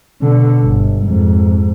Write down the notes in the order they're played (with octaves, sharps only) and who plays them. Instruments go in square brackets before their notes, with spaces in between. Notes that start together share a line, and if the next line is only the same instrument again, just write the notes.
[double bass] B2 D3
G1
F2 G#2